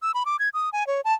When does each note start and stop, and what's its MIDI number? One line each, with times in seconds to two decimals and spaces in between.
0.02 0.12 88
0.14 0.24 83
0.26 0.36 86
0.39 0.49 92
0.54 0.70 87
0.73 0.86 80
0.87 1.01 73
1.05 1.13 81